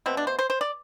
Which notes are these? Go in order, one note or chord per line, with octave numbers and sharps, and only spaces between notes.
B2 A3 C4
D4
C5
C5
C5
D5